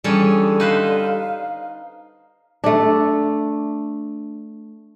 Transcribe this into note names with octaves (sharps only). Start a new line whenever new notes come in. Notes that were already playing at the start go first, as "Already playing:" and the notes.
D3 E3 G3 C#4 G#4 A4
D#4 B4 C5 F5
A3 D4